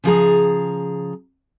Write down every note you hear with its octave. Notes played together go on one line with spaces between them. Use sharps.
C#3 F3 G#4 A#5